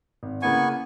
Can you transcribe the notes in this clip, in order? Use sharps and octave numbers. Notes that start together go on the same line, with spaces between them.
G#1
C#3 A#3 B3 E4 G#5 C#6